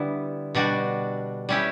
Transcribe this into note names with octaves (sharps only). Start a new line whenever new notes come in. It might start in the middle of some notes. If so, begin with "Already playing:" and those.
Already playing: D3 G3 B3 E4
B2 G3 D4 F#4
G3 C#4 E4 G4